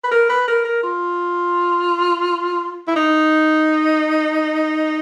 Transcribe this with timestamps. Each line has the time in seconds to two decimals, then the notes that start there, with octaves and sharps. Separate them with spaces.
0.04 B4
0.11 A#4
0.29 B4
0.47 A#4
0.65 A#4
0.83 F4
2.88 E4
2.96 D#4